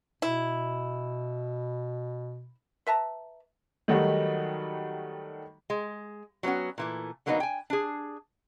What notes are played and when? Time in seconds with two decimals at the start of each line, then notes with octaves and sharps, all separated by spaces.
0.22 B2 E4
2.87 B4 E5 A5 A#5
3.88 D#3 F#3 G3 A3 D#4 F#4
5.70 G#3
6.43 F#3 G3 B3 C#4 F#4
6.78 A#2 E3 A3
7.26 D3 F#3 A#3 B3 C#4 D#4
7.40 G5 G#5
7.70 D4 G#4